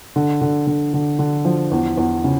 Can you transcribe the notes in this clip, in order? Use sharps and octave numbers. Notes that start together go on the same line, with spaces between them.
D3
D3
D3
D3
D3
F3
E2
E2
C#3